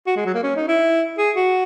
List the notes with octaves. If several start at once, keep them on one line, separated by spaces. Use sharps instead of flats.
F#4
G#3
F#3
A#3
C#4
D#4
E4
G#4
F#4